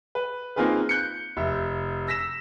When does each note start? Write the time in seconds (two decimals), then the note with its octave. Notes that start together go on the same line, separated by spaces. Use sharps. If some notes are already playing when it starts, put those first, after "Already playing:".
0.15 B4
0.56 A#3 C4 D#4 F4 G#4 B4
0.89 F#6 G6 C#7
1.37 F1 E5
2.07 E6 A#6 B6 E7